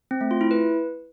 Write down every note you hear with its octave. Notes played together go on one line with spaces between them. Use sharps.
C4
A3
F4
E4
B4